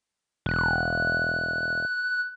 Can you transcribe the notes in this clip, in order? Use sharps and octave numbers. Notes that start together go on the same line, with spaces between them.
E1 F#6